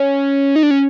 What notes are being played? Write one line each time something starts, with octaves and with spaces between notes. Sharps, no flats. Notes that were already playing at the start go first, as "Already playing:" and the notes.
Already playing: C#4
D#4
D4
C#4